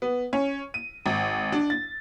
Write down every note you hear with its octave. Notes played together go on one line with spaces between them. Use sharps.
B3
C#4
D#7
G#1
D4
A6